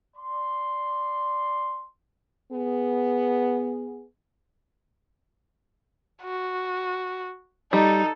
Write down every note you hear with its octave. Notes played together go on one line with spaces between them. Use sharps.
D5 C6
B3 G#4
F#4
G3 D#4 A4